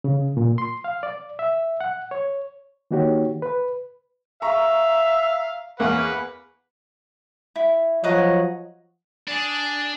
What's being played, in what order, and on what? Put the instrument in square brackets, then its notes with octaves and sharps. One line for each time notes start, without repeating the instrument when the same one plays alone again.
[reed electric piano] C#3
A#2
C6
F5
D5
E5
F#5
C#5
D#3 A#3 D#4 F#4 G4 C#5
B4
[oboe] E5 [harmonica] F5 [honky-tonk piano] A#5 C#6
[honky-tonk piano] E2 A#3 [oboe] C#4 [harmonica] B4 F#5
[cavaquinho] E4
[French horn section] F3 F#3 [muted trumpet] C#5 [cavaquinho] D#5 F#5 A#5
[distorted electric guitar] D4 [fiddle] G#4 D5